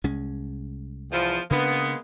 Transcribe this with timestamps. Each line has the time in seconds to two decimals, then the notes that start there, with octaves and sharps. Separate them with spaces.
0.04 C2 G#3 C#4
1.11 E2 F3
1.51 C#3 G#3 A#3 B3 D4